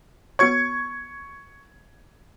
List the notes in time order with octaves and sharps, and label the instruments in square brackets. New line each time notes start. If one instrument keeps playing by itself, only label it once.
[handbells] B3 F#4 C#5 [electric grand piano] C#6 G#6 C#7